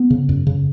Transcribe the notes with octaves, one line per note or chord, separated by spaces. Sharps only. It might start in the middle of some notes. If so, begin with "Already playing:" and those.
Already playing: B3
C#3
F#2
C#3